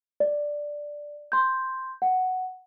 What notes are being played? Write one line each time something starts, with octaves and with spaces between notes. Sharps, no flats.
D5
C6 G6
F#5